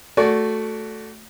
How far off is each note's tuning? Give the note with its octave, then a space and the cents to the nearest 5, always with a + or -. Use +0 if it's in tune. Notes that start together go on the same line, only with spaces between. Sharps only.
A3 +0 F#4 +0 D5 -25